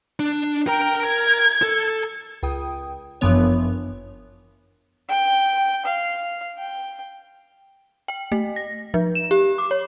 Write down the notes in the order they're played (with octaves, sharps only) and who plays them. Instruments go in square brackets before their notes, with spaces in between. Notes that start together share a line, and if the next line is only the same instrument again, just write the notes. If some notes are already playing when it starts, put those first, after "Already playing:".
[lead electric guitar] D4
[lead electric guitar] A#4 A#5 [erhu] G5
[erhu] G#6
[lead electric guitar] A4
[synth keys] C#2 G5 D#6
G1 F#2 E3 F3 B3 C#5
[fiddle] G5
F5
G5
[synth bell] G5
A3
A#6
F3
E7
G4
D6
C#5